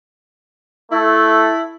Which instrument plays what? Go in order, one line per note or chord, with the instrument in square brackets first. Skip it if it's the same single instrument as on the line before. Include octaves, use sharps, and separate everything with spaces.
[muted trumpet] A3 [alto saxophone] E4